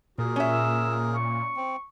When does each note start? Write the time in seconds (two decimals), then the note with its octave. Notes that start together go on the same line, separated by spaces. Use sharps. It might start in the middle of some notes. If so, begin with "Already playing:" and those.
0.18 A#2 F#4 G#4 A#4
0.36 C#4 E5
0.52 E6
1.16 C#6
1.56 C4